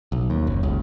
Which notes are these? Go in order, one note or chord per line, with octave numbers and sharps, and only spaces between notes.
B1
D#2
F#1
C#2